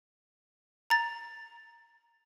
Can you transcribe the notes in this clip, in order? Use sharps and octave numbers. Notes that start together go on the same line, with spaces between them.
A#5 A6